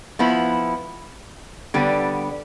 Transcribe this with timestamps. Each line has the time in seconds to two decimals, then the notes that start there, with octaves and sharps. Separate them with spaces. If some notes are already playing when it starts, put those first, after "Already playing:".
0.19 F3 B3 E4
1.74 D3 G3 B3